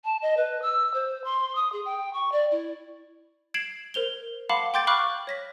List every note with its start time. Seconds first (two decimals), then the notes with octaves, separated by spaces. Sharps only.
0.04 A5
0.22 D#5
0.37 B4
0.62 E6
0.94 C5
1.24 C6
1.55 D#6
1.73 G#4
1.85 G5
2.14 C#6
2.32 D5
2.51 E4
3.54 G#6 C7 D7 E7 F#7
3.94 A#4 C5 F7 G7
4.49 F5 F#5 A5 B5 C6 D6
4.74 G5 C6 D6 G6 A6 D7
4.87 F5 B5 C#6 D6 F6 F#6
5.27 C#5 A#6 B6